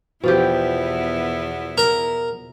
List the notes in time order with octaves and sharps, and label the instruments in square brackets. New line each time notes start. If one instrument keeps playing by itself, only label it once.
[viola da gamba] E2 B3 E4 [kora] B2 F3 G4
[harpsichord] A#4